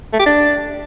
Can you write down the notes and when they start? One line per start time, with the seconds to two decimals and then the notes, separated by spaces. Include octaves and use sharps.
0.13 A3
0.19 G4
0.26 D4